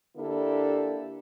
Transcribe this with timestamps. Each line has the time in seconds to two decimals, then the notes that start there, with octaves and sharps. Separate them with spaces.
0.17 D3 A#3 D4 E4 G4 A4